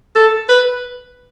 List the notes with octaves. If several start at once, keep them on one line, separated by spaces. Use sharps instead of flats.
A4
B4